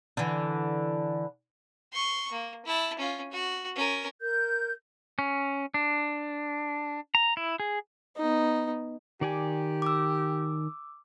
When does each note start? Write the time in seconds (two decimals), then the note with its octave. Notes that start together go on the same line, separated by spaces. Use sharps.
0.17 D3 E3
1.93 C6 C#6
2.31 A#3
2.65 E4 A5
2.98 C#4 F4
3.32 F#4
3.75 C#4 A#4
4.20 A#4 G6
5.19 C#4
5.74 D4
7.15 A#5
7.37 E4
7.60 G#4
8.17 B3 D#4
9.21 D#3 G4 D5 G#5
9.82 D6 E6